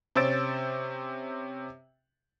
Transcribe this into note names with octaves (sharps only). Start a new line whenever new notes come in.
C3 C#4 C5 E6 A6 D7